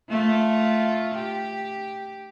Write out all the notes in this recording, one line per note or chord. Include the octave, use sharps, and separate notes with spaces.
A3 F4
G4